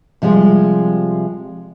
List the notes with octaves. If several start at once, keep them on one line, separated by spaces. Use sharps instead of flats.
C3 F3 G3 G#3